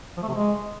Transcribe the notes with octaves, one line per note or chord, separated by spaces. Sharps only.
F3
A3
C3
G#3